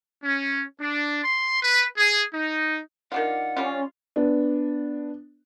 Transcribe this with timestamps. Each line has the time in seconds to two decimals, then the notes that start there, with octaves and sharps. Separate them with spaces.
0.24 C#4
0.80 D4
1.24 C6
1.63 B4
1.98 G#4
2.33 D#4
3.12 D#3 D4 F4 F#5
3.57 G3 C#4 F4
4.16 B3 D4